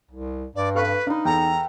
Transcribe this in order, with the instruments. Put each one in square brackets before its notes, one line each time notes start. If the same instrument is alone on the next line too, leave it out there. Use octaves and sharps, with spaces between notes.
[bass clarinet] C2
[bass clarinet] G2 [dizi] D5
[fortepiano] A4 F5 C#6 [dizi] B4
[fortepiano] D4 [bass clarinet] D#4 [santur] B4 F5
[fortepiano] E2 [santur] A4 G5 [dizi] A#5